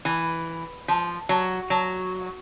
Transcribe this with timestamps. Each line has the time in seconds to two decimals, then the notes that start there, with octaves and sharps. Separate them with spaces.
0.05 E3
0.88 F3
1.29 F#3
1.70 F#3